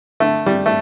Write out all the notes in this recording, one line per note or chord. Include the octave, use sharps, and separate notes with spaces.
D3 A3
G3
A3